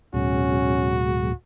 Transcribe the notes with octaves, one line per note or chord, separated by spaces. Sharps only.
D1 B2 F#3 G#3 C#4 F#4